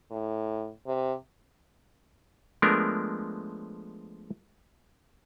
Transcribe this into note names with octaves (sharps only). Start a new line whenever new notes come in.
A2
C3
F3 G#3 A3 B3 D4 A#4